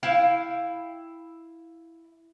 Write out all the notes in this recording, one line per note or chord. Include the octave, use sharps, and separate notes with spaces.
E4 F5 G5